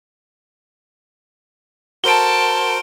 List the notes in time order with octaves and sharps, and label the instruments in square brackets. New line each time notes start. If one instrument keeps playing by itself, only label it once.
[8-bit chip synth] F#4 A#4 C5 [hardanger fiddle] A4 A5 [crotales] D7 G7